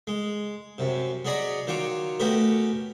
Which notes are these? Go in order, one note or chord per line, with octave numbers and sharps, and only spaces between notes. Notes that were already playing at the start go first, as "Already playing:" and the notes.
G#3
F#2 C3
F#3 G#4 D5 D#5 B5 C#6
D#3 F#3 F4 C#6 D6
A3 B3 C#4 F#4 G4 A#4